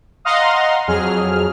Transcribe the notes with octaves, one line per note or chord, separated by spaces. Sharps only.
D#5 F5 F#5 A#5 C6
F2 F#3 G#4 F6